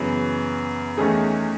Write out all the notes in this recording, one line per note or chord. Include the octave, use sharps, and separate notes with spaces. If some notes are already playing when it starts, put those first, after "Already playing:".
Already playing: F#2 C#3 E3 B3
E2 D#3 A3 C#4 G#4